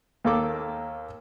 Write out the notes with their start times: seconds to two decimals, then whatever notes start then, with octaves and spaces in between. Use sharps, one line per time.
0.24 D#2 A#3 A4 D6